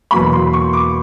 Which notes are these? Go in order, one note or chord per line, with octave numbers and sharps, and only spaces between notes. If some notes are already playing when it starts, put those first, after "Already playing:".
E2 B2 F#3 A#3 B5
C6
C#6
D6